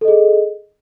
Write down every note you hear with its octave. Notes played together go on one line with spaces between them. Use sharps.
G#4 A4 D#5